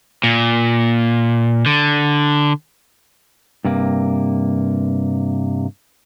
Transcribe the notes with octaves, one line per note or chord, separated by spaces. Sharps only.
A#2
D3
G2 C3 A#3